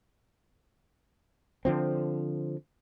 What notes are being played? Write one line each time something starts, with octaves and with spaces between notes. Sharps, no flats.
D3 F3 C4